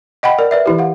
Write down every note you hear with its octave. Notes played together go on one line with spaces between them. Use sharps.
D#5 F#5 G5 B5
A#4 D5
B4 D5 E5
E3 E4 G4
F5 F#5